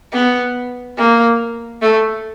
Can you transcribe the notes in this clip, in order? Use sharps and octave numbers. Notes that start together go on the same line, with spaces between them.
B3
A#3
A3